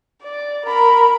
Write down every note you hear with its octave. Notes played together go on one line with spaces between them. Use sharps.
D5
A#4 B5